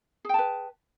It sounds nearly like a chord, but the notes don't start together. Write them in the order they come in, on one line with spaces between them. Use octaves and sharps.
G#4 G5 A5 B4